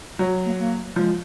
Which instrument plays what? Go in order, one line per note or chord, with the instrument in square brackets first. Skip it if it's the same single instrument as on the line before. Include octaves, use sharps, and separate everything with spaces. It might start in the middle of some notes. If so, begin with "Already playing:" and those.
[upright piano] F#3 [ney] F#4
[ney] A#3
A#3
[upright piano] F3 [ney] G#3